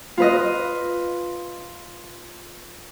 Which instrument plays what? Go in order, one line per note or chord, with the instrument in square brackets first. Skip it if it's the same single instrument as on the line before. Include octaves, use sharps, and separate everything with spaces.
[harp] F4 B4 D#5